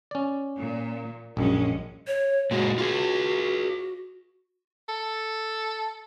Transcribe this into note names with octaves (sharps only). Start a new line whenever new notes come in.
C#4 D5
A#2
A#1 F#2 G3 G#3 C#4
C#5
A#2 G#3 F#4
F4 G#4
A4